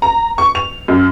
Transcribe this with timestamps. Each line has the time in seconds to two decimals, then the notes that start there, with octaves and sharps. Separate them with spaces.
0.02 A#5
0.38 C#6
0.55 F7
0.88 F#2